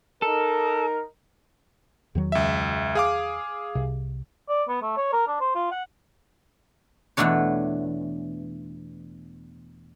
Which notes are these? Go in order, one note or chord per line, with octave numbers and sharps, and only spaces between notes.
D#4 A4 A#4
E2 D#3 F#3
C#2 E5
G#4 F5 D6
C2 C3
D5
B3
A3
C#5
A#4
D4
C5
F4
F#5
E2 B2 A3 D4 C#5